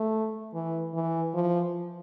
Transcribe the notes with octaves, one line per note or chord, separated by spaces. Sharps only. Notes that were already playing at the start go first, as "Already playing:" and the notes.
Already playing: A3
E3
E3
F3